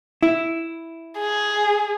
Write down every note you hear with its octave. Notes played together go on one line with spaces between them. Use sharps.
E4
G#4